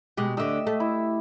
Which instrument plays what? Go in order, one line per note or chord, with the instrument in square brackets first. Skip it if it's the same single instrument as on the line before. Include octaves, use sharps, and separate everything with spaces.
[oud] B2 G#3 [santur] G4
[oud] D2 D3 [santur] D#5 E5 E6
[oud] A3
[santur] E4